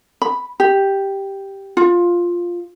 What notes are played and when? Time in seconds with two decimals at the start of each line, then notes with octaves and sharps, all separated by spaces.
0.22 B5
0.60 G4
1.77 F4